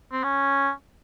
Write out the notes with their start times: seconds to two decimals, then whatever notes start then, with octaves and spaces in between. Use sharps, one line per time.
0.12 C4
0.23 C#4